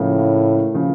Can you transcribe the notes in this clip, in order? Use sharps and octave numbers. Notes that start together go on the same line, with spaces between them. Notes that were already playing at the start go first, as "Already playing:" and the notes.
Already playing: A2 C#3 F3 A#3
C#3 F3 A#3